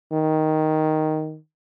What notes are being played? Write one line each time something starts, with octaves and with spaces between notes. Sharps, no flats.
D#3